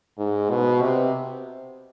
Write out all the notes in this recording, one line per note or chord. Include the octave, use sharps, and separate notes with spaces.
G#2
B2
C3